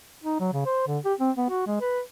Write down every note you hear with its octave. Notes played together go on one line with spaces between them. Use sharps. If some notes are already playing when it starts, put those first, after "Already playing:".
D#4
F#3
C#3
C5
D3
G4
C4
B3
F#4
G#3
B4